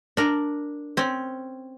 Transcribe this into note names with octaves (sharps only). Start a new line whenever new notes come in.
D4 A#4
C4 C#4